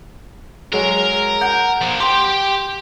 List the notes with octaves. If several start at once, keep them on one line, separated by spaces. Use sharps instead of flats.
F#3 G#3 A#4
F#5 G6
F3 A#3
G4 G5 C6